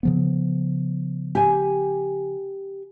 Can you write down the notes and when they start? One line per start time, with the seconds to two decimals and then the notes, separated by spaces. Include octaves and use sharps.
0.03 C#3 F3 B3
1.35 G4 G#5